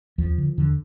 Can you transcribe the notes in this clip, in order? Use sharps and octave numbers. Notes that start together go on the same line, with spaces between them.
D#2 F3
D3
D#2 D3